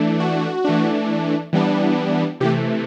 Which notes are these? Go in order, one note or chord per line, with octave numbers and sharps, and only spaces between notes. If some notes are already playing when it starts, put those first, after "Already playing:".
Already playing: E3 A3 D4
F#4
E3 A3 D4
E3 G3 B3 D4
C3 E3 A3 G4